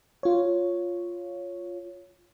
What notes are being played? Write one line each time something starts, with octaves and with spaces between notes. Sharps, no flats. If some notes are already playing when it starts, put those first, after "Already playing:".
F4 C#5